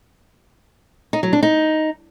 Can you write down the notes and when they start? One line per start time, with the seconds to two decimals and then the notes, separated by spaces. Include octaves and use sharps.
1.13 D#4
1.23 F#3
1.33 D4
1.43 D#4